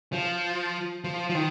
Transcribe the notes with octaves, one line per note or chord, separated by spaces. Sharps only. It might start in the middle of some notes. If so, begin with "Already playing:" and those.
F3
F3
F3
D#3